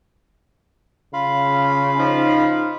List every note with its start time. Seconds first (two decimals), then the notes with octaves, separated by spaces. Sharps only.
1.13 C#3 F4 F5 B5
1.99 F3 D#4